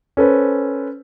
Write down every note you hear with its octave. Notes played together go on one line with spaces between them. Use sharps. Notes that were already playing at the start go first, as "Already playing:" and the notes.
C#4 A4 B4 C5